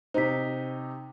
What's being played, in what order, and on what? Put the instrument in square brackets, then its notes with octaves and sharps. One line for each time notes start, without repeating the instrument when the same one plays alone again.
[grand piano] C3 D#4 [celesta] C5 B6